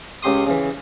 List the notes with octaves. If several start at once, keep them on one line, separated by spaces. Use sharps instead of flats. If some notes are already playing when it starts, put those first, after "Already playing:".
C#2 C#3 G4 C6 D#6
C#3 E3